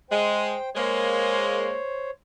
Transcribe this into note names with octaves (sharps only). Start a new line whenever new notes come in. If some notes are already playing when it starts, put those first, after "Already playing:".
G#3 C5 G5
G#3 A#3 C5 C#5